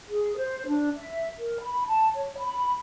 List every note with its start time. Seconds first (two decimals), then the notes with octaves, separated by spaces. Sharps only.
0.09 G#4
0.36 C5
0.67 D4
0.96 E5
1.38 A#4
1.61 B5
1.86 A5
2.15 C#5
2.38 B5